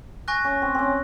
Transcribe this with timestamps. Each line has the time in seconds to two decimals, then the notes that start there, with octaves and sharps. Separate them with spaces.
0.28 G#5 C#6 F#6 A#6
0.45 C#4
0.62 C4
0.75 C4 C#4